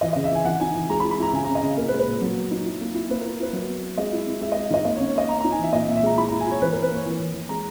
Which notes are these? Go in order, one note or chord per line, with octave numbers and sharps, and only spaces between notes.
E3 D#5
D#5
C#3
E5
E3 G#5
E3 F#5
D#4 G#5
E3
G#3 A#5
B5
E4
B5
E4 A#5
C#3 G#5
A#5
C#4
D#5
C#3
A#2 A#4
B4
G#3
B4
A#2
F#3
B3
D#4
E4
A#3
E4
A#3 B4
A#4
E4
E4 B4
F#3
B3
B3
G#3 D#5
E4
E4
G#3 E5
D#5
G#3
D#3 D#5
A#3 D#5
C#5
C#4
C#5
A#3 D#5
B3 A#5
A#5
D#4
G#5
E3 E5
A#2 D#5
E5
A#2
E5
G#3 A#5
E4 B5
A#5
E4
G#5
E4 C#5
E3 B4
A#4
E3
B4
A#3 C#5
E3
E3
E3
G#3 A#5